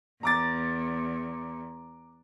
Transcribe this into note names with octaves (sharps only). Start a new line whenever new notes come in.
E2 A#5 D6 A6